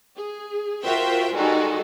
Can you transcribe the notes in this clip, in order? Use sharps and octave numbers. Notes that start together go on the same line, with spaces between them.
G#4
F4 F#4 A#4 C5 E5 G5
D#3 G3 G#3 D#4 F#4 A4